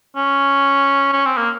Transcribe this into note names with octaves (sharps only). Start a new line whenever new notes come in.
C#4
C#4
C4
A#3